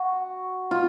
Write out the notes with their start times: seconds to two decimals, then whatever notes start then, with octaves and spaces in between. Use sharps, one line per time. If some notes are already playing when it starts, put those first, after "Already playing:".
Already playing: F#4
0.71 F4